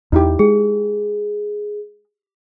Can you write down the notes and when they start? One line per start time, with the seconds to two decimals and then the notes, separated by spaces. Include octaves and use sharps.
0.12 E2 D#4 E4 G4
0.39 G#3 G#4